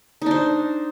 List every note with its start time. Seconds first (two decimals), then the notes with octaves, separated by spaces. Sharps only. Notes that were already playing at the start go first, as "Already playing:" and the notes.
0.22 D#4
0.26 D4
0.31 C5